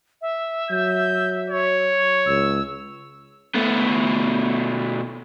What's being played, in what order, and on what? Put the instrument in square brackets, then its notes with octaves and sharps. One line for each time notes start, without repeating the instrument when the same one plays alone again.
[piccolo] E5
[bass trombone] F#3 [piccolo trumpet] G6
[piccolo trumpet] C#5
[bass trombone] C#2 [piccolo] E6
[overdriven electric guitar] B2 A3